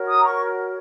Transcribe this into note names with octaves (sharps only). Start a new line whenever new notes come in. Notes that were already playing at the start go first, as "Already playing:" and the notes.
Already playing: F#4 A#4 C#5
D#6
A#5
C#6